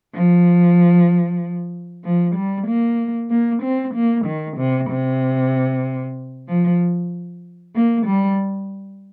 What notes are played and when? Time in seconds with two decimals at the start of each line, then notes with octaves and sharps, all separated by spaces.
0.14 F3
2.04 F3
2.36 G3
2.67 A#3
3.30 A#3
3.63 C4
3.95 A#3
4.25 D#3
4.57 C3
4.90 C3
6.48 F3
7.75 A#3
8.06 G3